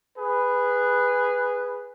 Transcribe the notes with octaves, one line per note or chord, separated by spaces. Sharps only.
G#4 B4